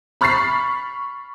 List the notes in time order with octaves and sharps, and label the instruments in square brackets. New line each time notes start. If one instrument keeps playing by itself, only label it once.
[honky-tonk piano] B5 C#6 F6 A6 B6 C7